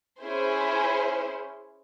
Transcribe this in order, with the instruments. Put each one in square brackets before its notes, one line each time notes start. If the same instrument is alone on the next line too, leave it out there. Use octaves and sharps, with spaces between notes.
[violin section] C#4 E4 G#4 C5